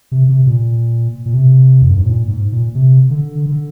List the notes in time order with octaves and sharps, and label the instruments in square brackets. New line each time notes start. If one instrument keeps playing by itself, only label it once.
[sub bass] C3
C3
A#2
A#2
C3
F2
G2
G#2
A#2
G#2
A#2
C3
D3
D3